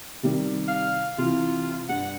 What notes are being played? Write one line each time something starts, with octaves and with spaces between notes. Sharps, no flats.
C3 D#3 G3
F5
C3 E3 F4
G2 F#5